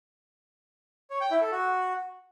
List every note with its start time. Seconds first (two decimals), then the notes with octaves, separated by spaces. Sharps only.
1.10 C#5
1.21 G5
1.31 E4
1.41 A4
1.52 F#4